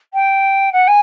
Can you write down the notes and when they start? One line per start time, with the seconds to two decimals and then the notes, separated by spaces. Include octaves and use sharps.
0.13 G5
0.72 F#5
0.87 G#5